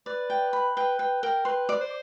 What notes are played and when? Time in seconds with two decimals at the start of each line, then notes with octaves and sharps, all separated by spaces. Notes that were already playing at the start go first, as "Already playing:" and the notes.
0.06 B4 D5
0.30 G5
0.53 B5
0.76 B4 G5
0.99 B4 G5
1.23 A#4 G5
1.45 B4 C6
1.69 D5
1.80 C5